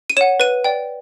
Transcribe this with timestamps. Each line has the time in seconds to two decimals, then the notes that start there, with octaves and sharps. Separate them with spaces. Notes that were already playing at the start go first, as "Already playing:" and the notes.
0.10 D#7
0.17 C#5 F#5 E7
0.40 B4 D#7
0.64 D5 G5